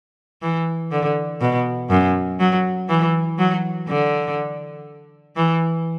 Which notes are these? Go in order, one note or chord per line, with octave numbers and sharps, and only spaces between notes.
E3
D3
B2
F#2
F#3
E3
F#3
D3
E3